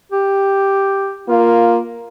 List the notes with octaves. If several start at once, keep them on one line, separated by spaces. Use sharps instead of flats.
G4
A#3 F4